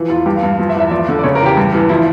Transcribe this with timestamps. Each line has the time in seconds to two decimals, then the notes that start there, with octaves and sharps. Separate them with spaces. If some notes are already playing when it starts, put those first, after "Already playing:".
Already playing: E3 F3
0.10 E2 F4
0.25 G2 G4
0.37 F5
0.43 G2
0.59 F3
0.69 E5
0.75 E2
0.80 E5
0.91 F3 D5
1.09 D3
1.19 D5
1.24 C#3 C#5
1.35 A#4
1.41 E2 G4
1.57 G2
1.74 E3
1.89 F3 E4